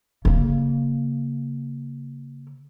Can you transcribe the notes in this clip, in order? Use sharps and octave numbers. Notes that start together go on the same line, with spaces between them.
C#3 A#3